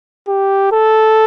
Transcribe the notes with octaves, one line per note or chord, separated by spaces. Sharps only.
G4
A4